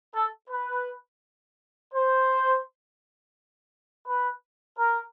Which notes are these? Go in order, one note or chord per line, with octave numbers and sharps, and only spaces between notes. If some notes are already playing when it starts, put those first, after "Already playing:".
A4
B4
C5
B4
A#4